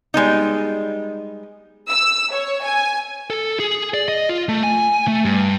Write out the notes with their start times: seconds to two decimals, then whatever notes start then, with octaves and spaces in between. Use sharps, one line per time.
0.14 G3 G#3 B3 D#4
1.88 E6
2.33 C#5
2.63 G#5
3.30 A4
3.60 G#4
3.94 D5
4.08 D#5
4.29 F4
4.49 A3
4.63 G#5
5.08 A3
5.25 G2